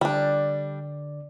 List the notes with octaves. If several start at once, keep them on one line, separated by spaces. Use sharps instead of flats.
D3 G3 D4 D5